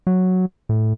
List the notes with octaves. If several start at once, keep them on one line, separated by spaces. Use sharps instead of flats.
F#3
A2